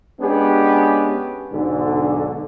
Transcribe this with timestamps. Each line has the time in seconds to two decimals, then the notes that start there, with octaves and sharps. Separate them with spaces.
0.21 G#3 B3 C#4 D4 G4 G#4
1.53 B1 G#2 D3